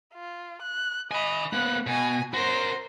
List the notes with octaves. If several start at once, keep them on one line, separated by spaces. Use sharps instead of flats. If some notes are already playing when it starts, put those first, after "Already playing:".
F4
F#6
D#5 G#5 B5
A#3 B3 F#6
B2 G#5
F#4 A#4 C5